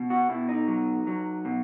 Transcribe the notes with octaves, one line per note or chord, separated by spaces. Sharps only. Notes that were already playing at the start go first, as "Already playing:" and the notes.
Already playing: B2
F#4
B2 E4
D#4
F#3
F#3
B2